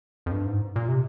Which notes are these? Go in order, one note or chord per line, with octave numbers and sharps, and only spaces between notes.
F2
G2
G#2
A#2
C3